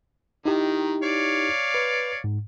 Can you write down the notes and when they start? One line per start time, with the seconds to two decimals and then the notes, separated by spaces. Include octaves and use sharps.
0.46 D#3 D#4 E4 G4
1.03 C#5 D5 F5
1.74 B4
2.24 G#2